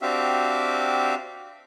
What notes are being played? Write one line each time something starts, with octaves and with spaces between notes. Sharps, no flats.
C4 D4 F#4 G4 E5 F5